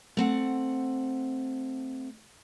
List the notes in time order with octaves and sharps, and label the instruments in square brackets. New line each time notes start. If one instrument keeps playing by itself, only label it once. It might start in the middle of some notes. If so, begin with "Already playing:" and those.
[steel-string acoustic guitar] A3 C4 F#5